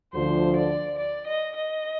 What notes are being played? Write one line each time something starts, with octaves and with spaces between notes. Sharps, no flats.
D2 D3 F3 C5
D5
D5
D#5
D#5